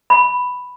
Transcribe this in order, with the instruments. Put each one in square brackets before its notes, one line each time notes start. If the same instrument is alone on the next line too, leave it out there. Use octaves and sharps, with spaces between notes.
[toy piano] B5